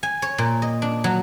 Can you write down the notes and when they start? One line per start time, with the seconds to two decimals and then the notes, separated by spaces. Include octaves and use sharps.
0.03 G#5
0.22 C#5
0.38 A#2
0.62 D#5
0.82 D4
1.04 F#3